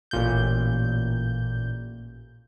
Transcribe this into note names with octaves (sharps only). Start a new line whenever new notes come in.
A1 A#2 G6